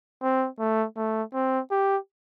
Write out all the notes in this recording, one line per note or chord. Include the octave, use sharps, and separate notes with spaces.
C4
A3
A3
C4
G4